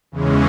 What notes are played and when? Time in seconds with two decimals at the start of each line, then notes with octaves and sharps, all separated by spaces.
0.12 E2 C#3 E3 G#3 C#4